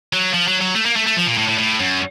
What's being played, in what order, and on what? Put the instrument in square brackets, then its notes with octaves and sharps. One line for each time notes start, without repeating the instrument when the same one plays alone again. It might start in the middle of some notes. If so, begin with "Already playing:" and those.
[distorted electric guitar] F#3
F3
F#3
F#3
A3
A#3
A3
A3
F3
A#2
A2
A2
A2
F#2